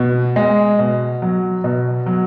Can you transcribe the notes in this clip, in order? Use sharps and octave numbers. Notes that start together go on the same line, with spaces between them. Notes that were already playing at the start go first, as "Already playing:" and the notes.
Already playing: B2
G#3
B2
F#3
B2
F#3